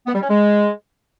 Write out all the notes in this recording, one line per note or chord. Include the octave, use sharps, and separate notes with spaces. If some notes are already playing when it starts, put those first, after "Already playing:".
B3
G3
C#4
G#3